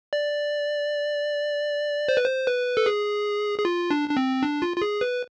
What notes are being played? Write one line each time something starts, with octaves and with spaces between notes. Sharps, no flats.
D5
C5
B4
C5
B4
A4
G#4
G#4
F4
D4
D4
C4
D4
F4
F4
G#4
B4